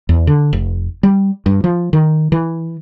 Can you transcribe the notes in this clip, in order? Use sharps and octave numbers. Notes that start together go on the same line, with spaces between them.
E2
D3
F1
G3
G2
F3
D#3
E3